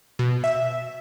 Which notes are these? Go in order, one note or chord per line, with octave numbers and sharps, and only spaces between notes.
B2
E5